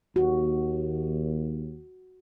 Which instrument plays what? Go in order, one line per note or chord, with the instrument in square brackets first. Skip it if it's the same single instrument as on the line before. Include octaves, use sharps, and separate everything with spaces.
[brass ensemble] D#2 [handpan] F#4